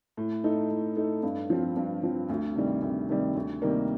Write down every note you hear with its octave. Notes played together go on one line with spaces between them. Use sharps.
A2
A3 D#4 A4
A2
A3 D#4 A4
G2
F3 C4 F4
G2
F3 C4 F4
D2
C3 D#3 G3
D2
C3 D#3 G3
D2
C3 D#3 G3 A#3